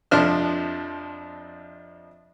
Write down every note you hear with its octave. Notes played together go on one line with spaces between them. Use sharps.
F2 C3 F3 D4 F6